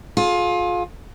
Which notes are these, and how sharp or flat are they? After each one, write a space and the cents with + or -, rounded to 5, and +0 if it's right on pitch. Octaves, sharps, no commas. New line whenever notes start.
F4 +25 G#4 +35